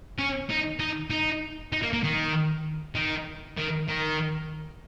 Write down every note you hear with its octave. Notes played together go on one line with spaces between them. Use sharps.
C#4
D#4
D#4
D#4
D#4
A#3
A#3
D#3
D#3
D#3
D#3